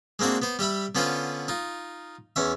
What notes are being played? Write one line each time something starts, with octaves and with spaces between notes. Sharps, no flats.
G#3 A#3 C4 D4 F#4
B3 C5
G3 G4 E5 B5
D3 B3 C#4 F4 B4 C5
D#4 F4
E2 C#4 E5